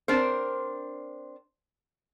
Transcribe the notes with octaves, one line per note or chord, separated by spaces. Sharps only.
C4 D4 A#4 C5